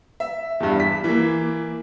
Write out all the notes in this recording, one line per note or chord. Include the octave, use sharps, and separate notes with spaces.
E5
E2 G2
B6
E3 A#3